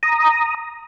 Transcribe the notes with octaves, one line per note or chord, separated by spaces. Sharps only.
A#5 D#6